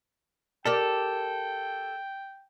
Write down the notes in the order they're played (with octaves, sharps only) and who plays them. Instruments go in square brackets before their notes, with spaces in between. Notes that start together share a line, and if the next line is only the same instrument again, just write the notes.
[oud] G4 A#4 D5 [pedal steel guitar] A4 [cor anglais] G5